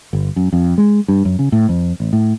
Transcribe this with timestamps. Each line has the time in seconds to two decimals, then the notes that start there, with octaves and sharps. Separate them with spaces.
0.13 G1
0.36 F#2
0.53 F2
0.78 G#3
1.08 G2
1.25 F#2
1.39 C#3
1.52 A2
1.69 F2
2.00 A1
2.13 A2